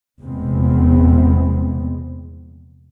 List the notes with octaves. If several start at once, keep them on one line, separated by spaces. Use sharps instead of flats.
F1 E2 A#2 G#3 B3 C4